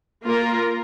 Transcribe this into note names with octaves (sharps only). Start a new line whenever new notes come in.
A#3 F4 A#4